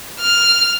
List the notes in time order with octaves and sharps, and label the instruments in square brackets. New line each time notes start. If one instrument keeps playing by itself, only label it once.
[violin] F6